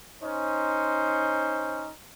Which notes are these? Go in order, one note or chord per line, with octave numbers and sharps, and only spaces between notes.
C#4 D#4 C5